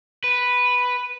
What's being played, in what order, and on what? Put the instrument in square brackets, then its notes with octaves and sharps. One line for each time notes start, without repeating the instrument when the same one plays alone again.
[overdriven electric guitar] B4